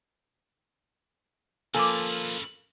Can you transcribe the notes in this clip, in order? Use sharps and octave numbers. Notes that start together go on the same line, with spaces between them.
F3 A#3 C#4 A4 B4 G#5 D6